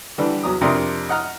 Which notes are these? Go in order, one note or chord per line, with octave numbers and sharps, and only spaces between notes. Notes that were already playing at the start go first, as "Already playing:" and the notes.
D3 E3 G3
E2 F#3 A#5 D#6
F2 C3 D4 A#4 C6 D#6
D#5 F#5 A#5 F6